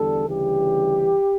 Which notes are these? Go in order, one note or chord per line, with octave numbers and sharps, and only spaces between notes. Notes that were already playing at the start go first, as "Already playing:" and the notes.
Already playing: E2 D3 G3 A4
D2 C#3 E3 G3 G4